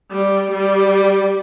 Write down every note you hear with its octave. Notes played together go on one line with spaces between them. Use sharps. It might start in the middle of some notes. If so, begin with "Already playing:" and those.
G3
G3